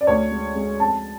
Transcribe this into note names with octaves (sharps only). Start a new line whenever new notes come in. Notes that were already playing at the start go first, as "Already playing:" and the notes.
D5
D2 C#5
G#3
G#3
F2 A5